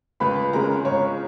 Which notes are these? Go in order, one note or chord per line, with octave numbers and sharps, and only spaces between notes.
C#2 B4 B5
C#3 G#3 A#4 A#5
C#2 C#5